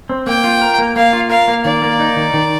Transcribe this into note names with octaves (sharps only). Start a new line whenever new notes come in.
C4
A#3 G5
F4
A#4
A#3
A#3 F5
F4
A#4 F5
A#3
D#3 D5
A#3
D#4
D#3
D#3